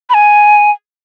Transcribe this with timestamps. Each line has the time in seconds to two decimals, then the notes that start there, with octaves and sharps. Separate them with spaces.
0.10 B5
0.14 G#5